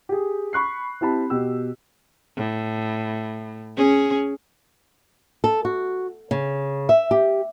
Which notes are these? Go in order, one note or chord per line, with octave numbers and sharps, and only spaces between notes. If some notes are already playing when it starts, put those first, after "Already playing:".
G4 G#4
B5 C#6 F#6 C7
C4 E4 G4 A5 B5
B2 G4 E6
A2
C#4 G#4
A4
F#4
C#3
E5
G4